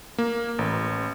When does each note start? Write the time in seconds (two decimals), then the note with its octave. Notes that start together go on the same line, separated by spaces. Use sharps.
0.18 A#3
0.59 A1